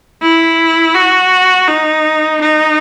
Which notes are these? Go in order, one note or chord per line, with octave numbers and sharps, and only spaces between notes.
E4
F#4
D#4
D#4